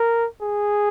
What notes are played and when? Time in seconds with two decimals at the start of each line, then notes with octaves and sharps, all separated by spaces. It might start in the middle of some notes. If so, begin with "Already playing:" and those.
Already playing: A#4
0.42 G#4